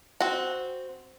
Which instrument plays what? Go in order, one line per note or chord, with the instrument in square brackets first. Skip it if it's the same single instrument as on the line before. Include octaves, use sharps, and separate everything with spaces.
[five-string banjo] C4 F#4